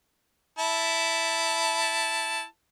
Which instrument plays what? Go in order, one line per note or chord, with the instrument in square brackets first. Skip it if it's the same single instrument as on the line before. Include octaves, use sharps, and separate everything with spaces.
[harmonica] E4 A5